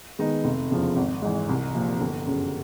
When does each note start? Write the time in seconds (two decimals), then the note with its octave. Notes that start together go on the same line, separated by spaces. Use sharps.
0.19 D#3 G#3 B3 D#4
0.44 F1
0.70 E2 C#3 F3
0.96 G#1
1.22 G#2 E3
1.49 C2
1.75 A#2 F3
2.01 G1
2.26 F#2 C#3